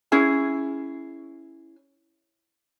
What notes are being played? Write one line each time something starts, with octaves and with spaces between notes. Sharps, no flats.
C#4 E4 G#4